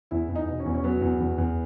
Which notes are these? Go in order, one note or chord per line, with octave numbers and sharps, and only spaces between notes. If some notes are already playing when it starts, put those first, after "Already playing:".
E2 E4
E2
D#4
B2
C#4
E2
C#4
F#3 B3
E2
E2
E2